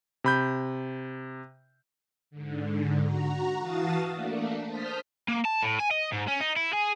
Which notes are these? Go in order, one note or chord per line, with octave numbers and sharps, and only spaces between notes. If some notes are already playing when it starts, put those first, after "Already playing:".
C3 B5 G6
G#2 D3
F#4 A#5
E3 F#4 F5 A5 D#6 A6
A3 A#3 D4
C5 A5 D#6 F6 G6 B6
A#3
A5
A2
G#5
D#5
G#2
C#4
D#4
E4
G#4